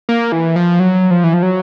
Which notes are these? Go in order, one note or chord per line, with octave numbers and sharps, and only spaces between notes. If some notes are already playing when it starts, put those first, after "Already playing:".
A#3
E3
F3
F#3
F3
E3
F3
F#3